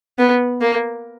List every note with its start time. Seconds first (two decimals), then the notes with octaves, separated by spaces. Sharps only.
0.18 B3
0.61 A#3